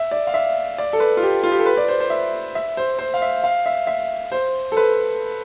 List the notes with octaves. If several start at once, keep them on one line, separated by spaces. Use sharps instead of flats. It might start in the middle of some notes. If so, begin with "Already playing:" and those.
Already playing: E5
D5
F5
E5
D5
A4
B4
F4
G4
F4
G4
A4
B4
D5
C5
C5
E5
E5
C5
C5
F5
E5
F5
E5
E5
C5
A4
B4